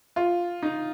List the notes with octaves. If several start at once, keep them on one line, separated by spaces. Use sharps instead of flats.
F4
D#4